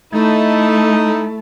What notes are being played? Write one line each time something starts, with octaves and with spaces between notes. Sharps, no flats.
A3 D#4 E4 A4